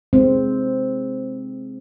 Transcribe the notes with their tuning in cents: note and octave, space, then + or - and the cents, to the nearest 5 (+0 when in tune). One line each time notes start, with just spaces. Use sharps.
G#3 +0 C4 +0